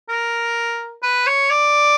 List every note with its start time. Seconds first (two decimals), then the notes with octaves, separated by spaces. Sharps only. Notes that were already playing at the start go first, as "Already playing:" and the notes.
0.09 A#4
1.03 B4
1.27 C#5
1.50 D5